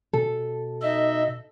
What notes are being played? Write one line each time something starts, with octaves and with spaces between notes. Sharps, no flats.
B2 A4
D#4 D#5 E5